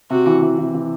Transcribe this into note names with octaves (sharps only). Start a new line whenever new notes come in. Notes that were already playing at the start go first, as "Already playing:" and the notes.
C3 F#4
E3
E3
E3
E3